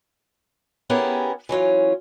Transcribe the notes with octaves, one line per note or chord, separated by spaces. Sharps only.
B3 C#4 E4 G4 G#4 A#4
E3 F#3 C#4 F4